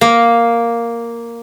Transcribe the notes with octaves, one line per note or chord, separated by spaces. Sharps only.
A#3